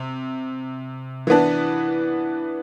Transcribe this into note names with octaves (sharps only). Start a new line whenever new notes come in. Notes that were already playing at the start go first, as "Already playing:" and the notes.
Already playing: C3
E3 B3 D4